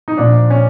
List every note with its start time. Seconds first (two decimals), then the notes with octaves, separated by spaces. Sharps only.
0.08 D#4
0.17 A#2 F3 D4
0.50 C#4